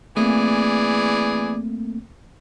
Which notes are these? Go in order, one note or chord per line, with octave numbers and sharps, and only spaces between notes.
E3 A3 A#3 C4 G#4 D5